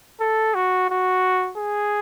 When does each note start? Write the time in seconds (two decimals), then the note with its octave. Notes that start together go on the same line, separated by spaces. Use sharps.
0.20 A4
0.54 F#4
0.90 F#4
1.58 G#4